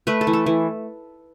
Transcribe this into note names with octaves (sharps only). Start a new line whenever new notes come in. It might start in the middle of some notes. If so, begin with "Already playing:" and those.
A3 B4
A4
E3
A4
E3